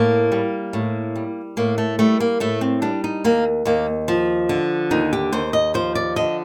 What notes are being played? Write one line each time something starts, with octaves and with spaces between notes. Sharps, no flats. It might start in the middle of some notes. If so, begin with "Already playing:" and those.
Already playing: A2 A#3
G3
A2
G3
A2 A#3
A3
G3 A3
A#3
A2 A3
C4
G3 D4
D#4
D#2 A#3
D#2 A#3
F3
D3
D#2 D#4
G4
D#2 C5
D#5
F3 C5
D5
D3 D#5